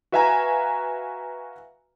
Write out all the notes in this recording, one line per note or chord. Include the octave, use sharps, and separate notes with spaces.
F#4 B4 E5 F5 G#5 A#5